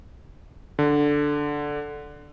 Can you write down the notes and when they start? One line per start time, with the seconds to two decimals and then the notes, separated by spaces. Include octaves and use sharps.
0.79 D3